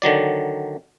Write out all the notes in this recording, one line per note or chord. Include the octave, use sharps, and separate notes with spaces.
D3 D#3 F#3 D5